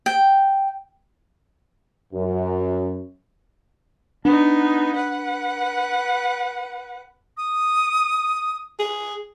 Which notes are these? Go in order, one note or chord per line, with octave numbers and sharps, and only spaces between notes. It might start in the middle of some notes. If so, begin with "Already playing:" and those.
G5
F#2
B3 D4 D#4
B4 F#5
D#6
G#4